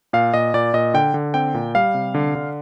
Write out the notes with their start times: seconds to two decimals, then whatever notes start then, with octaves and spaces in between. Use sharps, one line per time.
0.13 A#2 F5
0.34 A#2 D#5
0.54 A#2 D5
0.74 A#2 D#5
0.94 D3 G5
1.14 D3
1.34 C4 G5
1.54 A#2
1.75 G3 F5
1.94 C3
2.14 D3
2.35 D3